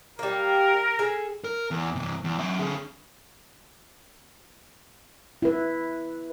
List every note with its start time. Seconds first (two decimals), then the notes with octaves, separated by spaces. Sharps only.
0.19 G3 A#3 A#4
0.99 G#4 A4
1.44 A#4
1.71 E2
1.95 C3 E3
2.24 E2
2.38 F#3 E5
2.58 D3 G#4
5.42 E4 B4